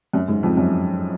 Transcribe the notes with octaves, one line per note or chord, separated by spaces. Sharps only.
F#2
G#2
F2
F#2